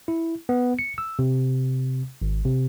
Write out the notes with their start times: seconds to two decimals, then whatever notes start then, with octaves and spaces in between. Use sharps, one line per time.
0.08 E4
0.49 B3
0.79 C#7
0.98 E6
1.19 C3
2.22 G#1
2.45 C3